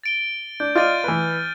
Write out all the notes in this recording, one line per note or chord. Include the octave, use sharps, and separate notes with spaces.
A6 D7 G7
D4 G6
F4 D5 D#5 F6 A6 D#7
E3 B4